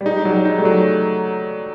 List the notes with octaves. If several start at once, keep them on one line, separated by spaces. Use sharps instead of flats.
G3
G#3 D#4
F#3 G3
G#3
D#4
G3 A3
F#3